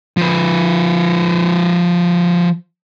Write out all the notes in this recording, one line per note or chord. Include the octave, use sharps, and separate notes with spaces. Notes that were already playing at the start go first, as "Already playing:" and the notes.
F3 B4